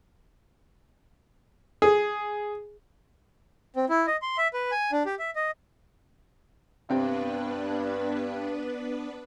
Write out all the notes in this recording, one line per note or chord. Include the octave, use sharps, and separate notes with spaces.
G#4
C4
E4
D#5
C6
E5
B4
G#5
D4
G4
E5
D#5
G2 C3 B3 C4 D4 B4